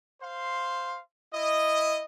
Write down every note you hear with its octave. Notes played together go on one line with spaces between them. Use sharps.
C5 F5 C6
E4 D#5